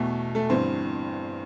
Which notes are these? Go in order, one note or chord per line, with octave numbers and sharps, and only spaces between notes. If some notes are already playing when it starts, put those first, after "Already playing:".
Already playing: E2 B2 A3
A3 A4
G1 G2 E3 C4 C5